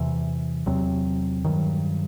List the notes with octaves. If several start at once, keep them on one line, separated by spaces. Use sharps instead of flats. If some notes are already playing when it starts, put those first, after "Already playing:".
Already playing: E2 C3 E3
E2 C3 F#3 C4
G2 D#3 F#3